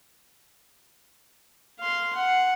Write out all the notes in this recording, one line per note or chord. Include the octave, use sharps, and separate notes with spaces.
F5 C6
F#5